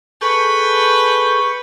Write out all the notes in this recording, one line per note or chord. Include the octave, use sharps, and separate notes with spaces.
G#4 A4 B4 C#6 G6